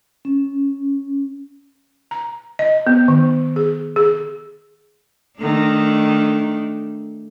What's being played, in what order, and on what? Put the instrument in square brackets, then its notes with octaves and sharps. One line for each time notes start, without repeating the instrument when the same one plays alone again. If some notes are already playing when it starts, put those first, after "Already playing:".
[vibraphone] C#4
[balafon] A#5
D#5
B3
D#3
G#4
G#4
[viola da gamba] D#3 A3 D4